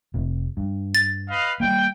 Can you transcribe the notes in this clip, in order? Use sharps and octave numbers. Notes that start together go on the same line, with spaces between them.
F1 C3
G2
A6
B4 D#5 F5
G3 A3 A#3 G5